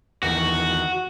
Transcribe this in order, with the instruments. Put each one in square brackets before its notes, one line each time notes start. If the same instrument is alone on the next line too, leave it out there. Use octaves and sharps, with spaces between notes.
[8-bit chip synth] E2 D#3 [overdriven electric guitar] F#4